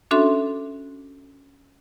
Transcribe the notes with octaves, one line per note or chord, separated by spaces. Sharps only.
C#4 D4 F#4 A4 E5 C6